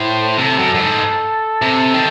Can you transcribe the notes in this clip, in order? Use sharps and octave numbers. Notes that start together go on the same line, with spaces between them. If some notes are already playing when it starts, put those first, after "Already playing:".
Already playing: A2 C5
C3 A4
F#2
F#2
G#2
C3
D#3